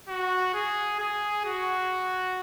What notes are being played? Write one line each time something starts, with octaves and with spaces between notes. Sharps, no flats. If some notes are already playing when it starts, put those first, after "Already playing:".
F#4
G#4
G#4
F#4